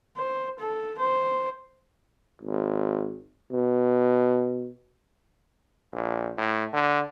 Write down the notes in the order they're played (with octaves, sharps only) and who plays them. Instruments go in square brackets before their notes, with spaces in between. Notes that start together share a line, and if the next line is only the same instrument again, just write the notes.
[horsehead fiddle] C5
A4
C5
[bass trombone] G#1
B2
A#1
A2
D3